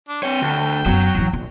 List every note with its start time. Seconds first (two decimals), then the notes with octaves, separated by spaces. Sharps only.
0.09 D4
0.23 C4 C#5 G5
0.42 D2
0.86 F#2 F#3 B3
1.15 A1 E3
1.33 A#1